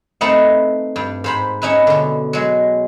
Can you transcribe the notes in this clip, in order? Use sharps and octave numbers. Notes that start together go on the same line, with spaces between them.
A3 C4 D#4 B4 E5 F#5
G2
G#2 C5 B5
C#4 D#4 E4 B4
B2 D3
F#3 G#3